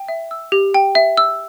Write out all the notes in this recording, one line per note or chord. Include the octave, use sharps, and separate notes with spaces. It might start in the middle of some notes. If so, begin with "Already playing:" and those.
Already playing: G5
E5
E6
G4
G5
E5
E6